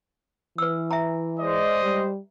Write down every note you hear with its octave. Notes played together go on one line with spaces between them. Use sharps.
E3 B4 E6
E5 G#5 A#5
G#3 C5 D5 D#5
G3